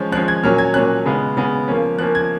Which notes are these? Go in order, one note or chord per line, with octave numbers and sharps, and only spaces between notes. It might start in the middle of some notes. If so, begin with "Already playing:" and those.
Already playing: F3 G#3 C#4
F3 G#3 C#4 F#6
G#6
A#2 F#3 C#4 F6
G#6
A#2 F#3 C#4 F#6
C#3 G#3 B3
C#3 G#3 B3
F3 A#3 C#4
F3 A#3 C#4 F#6
G#6